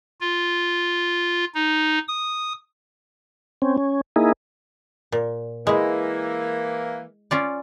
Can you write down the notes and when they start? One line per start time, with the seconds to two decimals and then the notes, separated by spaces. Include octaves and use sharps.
0.21 F4
1.55 D#4
2.08 D#6
3.62 C4 C#4
3.78 C#4
4.16 A#3 D#4 E4 G#4
5.12 A#2
5.67 E3 G#3 A#3 E4
7.31 C#4 F4 D5